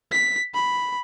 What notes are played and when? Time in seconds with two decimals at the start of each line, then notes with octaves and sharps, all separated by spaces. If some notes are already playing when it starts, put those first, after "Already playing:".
0.12 B6
0.54 B5